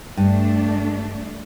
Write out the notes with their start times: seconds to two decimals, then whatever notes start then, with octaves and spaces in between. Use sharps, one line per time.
0.17 G2 A3 D4